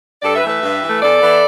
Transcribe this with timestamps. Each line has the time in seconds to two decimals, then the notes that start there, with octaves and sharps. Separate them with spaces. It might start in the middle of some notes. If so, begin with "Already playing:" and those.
0.22 G2 A4 D5
0.35 B4 E5
0.43 E3 A3
0.48 B4 E5
0.63 G2
0.82 E3 A3
1.01 E2 A4 D5
1.21 E3 B3 E4